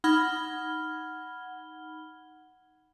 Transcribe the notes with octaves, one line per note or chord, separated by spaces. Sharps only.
D#4 F#5 B5 F6 G#6 G7